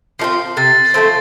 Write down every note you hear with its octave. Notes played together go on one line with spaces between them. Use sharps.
F3 A3 C4 C7
C3 A6
F3 A3 C4